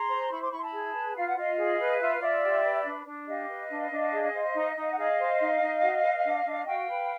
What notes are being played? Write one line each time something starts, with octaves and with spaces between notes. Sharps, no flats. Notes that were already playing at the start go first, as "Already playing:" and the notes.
Already playing: G#4 A#5 C6
C5
E4 B5 C#6
C6 D6
E4 B5 C#6
C6
A5 B5
G#4
B4
F4 F5
F#5
F4 D#5 F5
G#4
B4
F4 E5
F5
F4 D5 E5
G4
B4
D4
D4
G4 D#5 F5
B4
D4
D4
G#4
C5
D#4
D#4
F#5
G#4 D#5 F5
C5
D#4
D#4
F#4
B4
D4
D4
F#4 F5 G5
B4